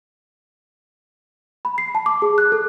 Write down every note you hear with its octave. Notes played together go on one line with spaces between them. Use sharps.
B5
C7
A5
D6
G#4
F#6
A4